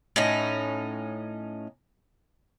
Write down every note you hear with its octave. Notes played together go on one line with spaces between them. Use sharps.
A2 C#4 D#4